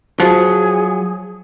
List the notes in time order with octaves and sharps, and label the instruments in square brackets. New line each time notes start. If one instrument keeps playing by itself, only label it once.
[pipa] F3 [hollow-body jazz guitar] F#3 [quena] G#4